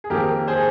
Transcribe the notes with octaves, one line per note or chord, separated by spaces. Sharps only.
G#4
F2 D#3 A#3 G4 A#4
G#4 C5